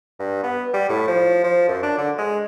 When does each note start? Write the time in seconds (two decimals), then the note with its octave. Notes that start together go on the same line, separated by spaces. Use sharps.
0.19 G2
0.43 B3
0.73 G3
0.89 A2
1.08 F3
1.44 F3
1.68 F#2
1.83 D4
1.98 D3
2.18 G#3